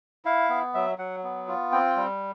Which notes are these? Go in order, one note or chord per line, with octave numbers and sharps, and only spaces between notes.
E4 F5
B3
F#3 E5
F#3 F#5
B3
F4
C4 G5
G3